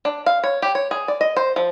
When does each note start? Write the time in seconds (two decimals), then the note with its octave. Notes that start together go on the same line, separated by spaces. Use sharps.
0.05 D4
0.26 F5
0.44 C#5
0.62 G4
0.75 C#5
0.91 G#4
1.08 D5
1.21 D#5
1.37 C5
1.56 F3